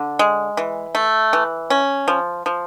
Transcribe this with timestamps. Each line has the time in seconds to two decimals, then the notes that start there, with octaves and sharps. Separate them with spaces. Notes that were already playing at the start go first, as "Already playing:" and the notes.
Already playing: D3
0.19 G#3
0.57 E3
0.95 A3
1.33 E3
1.70 C#4
2.08 F3
2.46 F3